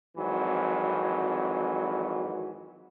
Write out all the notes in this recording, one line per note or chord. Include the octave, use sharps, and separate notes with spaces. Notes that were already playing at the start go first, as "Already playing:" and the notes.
G#1 F2 E3 F#3